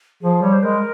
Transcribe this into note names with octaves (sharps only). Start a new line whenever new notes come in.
F3 G#4
G3 C#5
C5
G#3 A#4